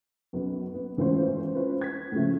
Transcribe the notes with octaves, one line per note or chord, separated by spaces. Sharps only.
B1 F#2 B3
B3
G#1 E3 A3 C#4 F4 C5
C#4 F4 B4 C5
G#6 B6
A2 C#3 F3 A3